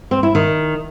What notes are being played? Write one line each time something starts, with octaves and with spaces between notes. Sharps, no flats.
C4
E4
D#3